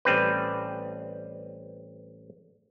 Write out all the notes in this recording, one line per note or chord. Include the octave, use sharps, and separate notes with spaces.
A1 G3 C4 B4